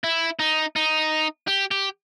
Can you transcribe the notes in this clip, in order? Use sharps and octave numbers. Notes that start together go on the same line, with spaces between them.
E4
D#4
D#4
G4
G4